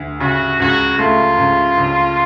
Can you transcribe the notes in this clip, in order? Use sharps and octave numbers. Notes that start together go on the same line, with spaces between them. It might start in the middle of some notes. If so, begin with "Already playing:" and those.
Already playing: D2
C#3 F#4
C#2 F#4
A3 F4
C#2
C#2